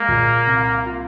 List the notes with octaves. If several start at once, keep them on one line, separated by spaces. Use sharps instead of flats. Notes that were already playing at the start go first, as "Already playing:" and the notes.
Already playing: G#3 A#3
A#2
C2
F4